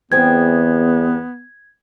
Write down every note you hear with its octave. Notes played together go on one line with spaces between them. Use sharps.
E2 G2 B3 C4 G#4 G#6